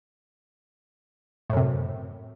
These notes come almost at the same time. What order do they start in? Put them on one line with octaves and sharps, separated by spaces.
A2 F#2 C3